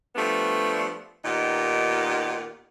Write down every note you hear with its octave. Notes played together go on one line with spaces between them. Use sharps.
F3 G3 A3 B3 D4
A#2 D#3 B3 D#4 G4